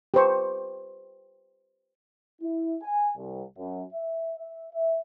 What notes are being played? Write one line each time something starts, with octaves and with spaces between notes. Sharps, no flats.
G4 B4 C5 C#6
E4
G#5
C2
F#2
E5
E5
E5